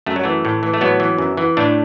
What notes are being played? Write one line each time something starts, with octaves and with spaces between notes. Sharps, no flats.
F#2 A3
F#3
E3 A3
A2
E3
A3
A2 F#3 B3
E3
F#2
E3
A2 A3 D4